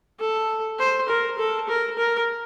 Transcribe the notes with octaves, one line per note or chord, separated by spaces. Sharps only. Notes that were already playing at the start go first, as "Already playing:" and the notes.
A4
C5
A#4
A4
A#4
A#4